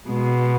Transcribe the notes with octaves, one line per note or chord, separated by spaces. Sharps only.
B2 G#3